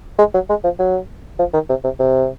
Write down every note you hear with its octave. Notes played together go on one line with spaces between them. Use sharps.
G#3
F#3
G#3
F3
F#3
F3
D#3
C3
C3
C3